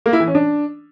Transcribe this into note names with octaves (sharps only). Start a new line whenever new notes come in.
A#3
E4
E3
C#4
D4